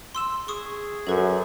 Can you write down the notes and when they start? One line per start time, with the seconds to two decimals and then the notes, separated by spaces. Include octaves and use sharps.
0.15 C6 E6 E7
0.48 G#4 C#6 D#6
1.07 F#2 A4 B4